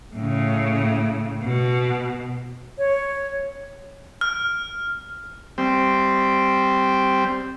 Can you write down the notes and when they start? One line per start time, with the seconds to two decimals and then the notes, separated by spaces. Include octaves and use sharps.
0.15 A2 C#3
1.43 B2
2.78 C#5
4.21 F6
5.58 G3 C4